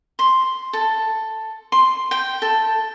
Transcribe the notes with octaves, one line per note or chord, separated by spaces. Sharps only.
C6
A4
C6
G5
A4